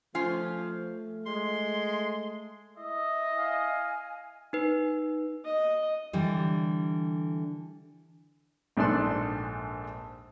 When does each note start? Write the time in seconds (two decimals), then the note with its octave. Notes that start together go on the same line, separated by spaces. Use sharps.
0.15 F3 A3 C#4 F4 G#5
1.26 G#3 C6
2.77 E4 D#5 E5
3.36 F5 G#5
4.53 D#4 B4
5.45 D#5
6.13 D3 E3 G3
8.77 A#1 G#2 D4 A4 C6 F#6